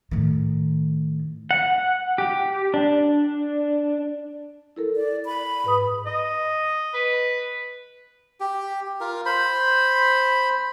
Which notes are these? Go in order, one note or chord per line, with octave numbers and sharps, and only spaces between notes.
A2 D#3
F#5
G4
D4
E4 A4 A#4
D5
B5
G#2 B4 D#6
D#5
B4
G4
F4 A#4
C5 B5